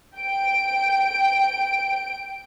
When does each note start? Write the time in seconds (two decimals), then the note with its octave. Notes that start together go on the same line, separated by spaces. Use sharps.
0.16 G5 D7